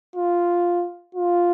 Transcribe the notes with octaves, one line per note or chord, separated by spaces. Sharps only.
F4
F4